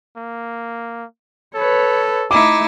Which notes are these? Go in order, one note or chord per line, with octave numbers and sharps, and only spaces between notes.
A#3
A4 B4 C#5
A3 D#4 E4 D6